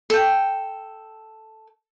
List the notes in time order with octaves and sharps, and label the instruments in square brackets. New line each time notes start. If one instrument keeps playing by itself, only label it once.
[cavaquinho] A4 G5